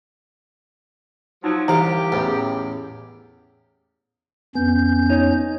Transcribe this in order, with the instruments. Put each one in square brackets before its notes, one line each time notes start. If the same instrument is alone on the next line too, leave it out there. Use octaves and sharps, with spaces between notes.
[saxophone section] F3 F#3 [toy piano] D#4
[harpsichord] C2 F5 [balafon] E3 A#5 [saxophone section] G4
[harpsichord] A1 E2
[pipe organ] F2 C#4 G6 [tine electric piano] B3
[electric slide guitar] D#4 C#5